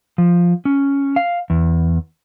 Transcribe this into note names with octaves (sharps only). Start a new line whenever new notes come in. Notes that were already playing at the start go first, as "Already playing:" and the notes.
F3
C#4
F5
E2